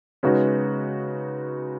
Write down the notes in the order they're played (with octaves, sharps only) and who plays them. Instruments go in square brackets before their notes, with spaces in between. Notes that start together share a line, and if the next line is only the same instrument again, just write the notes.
[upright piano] C#3 G#3 B3 D#4 F#4